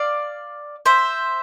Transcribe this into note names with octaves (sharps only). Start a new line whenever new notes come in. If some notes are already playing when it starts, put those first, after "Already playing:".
Already playing: D5 F5
C5 E5